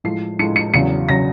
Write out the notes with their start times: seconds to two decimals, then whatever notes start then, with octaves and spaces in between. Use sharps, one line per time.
0.04 A2 F3 G#3 C7
0.39 A2 F3 G#3 C#7
0.56 C#7
0.74 E2 C#3 F#3 C#7
1.09 C#3 F#3 A#6